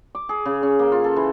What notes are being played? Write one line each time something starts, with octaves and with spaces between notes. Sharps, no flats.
D6
G#4
C#3
C#4
A#3
F4
A4
E3